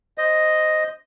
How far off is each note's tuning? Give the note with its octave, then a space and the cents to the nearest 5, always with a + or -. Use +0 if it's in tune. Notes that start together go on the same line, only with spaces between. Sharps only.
C5 +0 D#5 +0